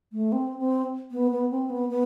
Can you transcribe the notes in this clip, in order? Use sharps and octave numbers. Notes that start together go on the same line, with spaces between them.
A3
C4
C4
B3
B3
C4
B3
B3